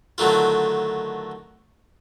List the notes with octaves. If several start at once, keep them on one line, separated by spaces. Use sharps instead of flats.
D3 D#3 F#3 A3 F4